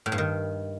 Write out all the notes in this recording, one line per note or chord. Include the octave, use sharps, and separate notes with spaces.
A2
G2
D#3